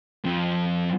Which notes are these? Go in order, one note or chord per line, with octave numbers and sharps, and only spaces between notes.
F2 F3